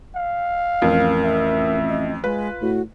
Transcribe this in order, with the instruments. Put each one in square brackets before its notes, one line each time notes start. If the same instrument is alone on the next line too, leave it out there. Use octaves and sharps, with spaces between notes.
[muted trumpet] F5
[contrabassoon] A1 [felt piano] F2 [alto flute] A#4
[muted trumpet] E5
[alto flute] D#5
[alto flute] G#3 [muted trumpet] F4 [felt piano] B4
[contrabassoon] A2 [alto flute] F#4